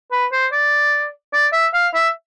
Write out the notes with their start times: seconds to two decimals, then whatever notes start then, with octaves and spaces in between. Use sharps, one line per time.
0.12 B4
0.32 C5
0.52 D5
1.33 D5
1.52 E5
1.74 F5
1.94 E5